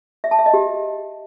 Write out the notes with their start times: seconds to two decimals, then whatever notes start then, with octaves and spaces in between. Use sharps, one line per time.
0.24 E5
0.31 A5
0.39 E5
0.46 D#5
0.54 G4